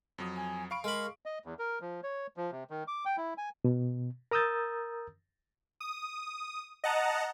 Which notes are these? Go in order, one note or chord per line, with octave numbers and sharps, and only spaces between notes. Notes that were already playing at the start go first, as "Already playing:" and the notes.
F2 F#3 D#6
G#5
F5 B5 C#6 D7
G#3 A#4 B5
D#5
E2
A#4
F3
C#5
F3
C3
D#3
D6
G5
E4
G#5
B2
A#4 A#5 D#6 E6 G6 A6
D#6
D#5 F#5 A5 A#5